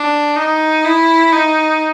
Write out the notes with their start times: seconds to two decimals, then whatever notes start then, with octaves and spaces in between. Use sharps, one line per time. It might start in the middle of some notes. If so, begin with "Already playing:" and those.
Already playing: D4
0.36 D#4
0.85 E4
1.33 D#4